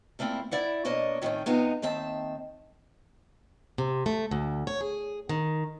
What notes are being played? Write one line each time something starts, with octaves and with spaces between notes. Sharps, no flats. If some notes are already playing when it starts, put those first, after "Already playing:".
A#2 A3 A#3 C4 E4
E4 D5 E5 F#5
B2 A#3 D4 C#5 D#5
A2 D#3 G3 A3 C4 C#4
C3 B3 D#4 F4
D#2 D#3 C4 E5 A5
C3
A3
D2
C#5
G#4
D#3